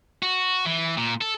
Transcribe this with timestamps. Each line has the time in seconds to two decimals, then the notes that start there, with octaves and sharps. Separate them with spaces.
0.23 F#4
0.65 E3
0.98 A#2
1.21 A4